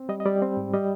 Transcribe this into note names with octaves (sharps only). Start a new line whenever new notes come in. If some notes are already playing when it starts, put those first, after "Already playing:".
Already playing: C4
G3 D#5
D#5
G3 D5
C4
G#2
G3 D#5